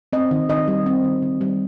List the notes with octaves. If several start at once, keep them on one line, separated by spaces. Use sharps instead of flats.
C4 D#5
D#3
D#3 D#5
G3
C4
D#3
D#3
G3